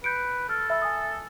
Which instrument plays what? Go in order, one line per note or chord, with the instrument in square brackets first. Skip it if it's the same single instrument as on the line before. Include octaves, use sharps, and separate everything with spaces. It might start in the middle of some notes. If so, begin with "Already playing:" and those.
[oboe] B4 [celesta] G6 C#7 D7
[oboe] A4 [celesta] F6
[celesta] E5 B5 E6
G#5 D#6